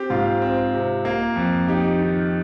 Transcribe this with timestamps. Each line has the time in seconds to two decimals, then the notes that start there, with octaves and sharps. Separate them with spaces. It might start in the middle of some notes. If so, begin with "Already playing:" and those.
Already playing: C4 G4
0.10 G#2 F4
0.42 C4
0.74 C3
1.05 A#3
1.36 F2
1.68 D#4 G4
1.99 D#3